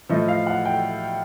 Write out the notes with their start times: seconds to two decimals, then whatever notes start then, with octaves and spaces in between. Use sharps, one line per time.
0.09 A2 F3 A3 D#5
0.28 F5
0.46 F#5
0.65 G5